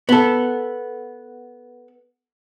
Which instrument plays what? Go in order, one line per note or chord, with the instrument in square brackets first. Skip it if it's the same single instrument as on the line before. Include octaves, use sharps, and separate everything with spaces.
[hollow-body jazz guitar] B3 A4